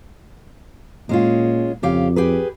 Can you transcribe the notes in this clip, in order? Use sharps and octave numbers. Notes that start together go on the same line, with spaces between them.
A#2 G#3 C#4 F4
F2 C#3 G4 F5
G4 G#4 B4